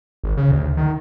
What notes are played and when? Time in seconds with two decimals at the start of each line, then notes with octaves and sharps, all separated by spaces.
0.24 G#1
0.37 C#3
0.51 D2
0.77 D#3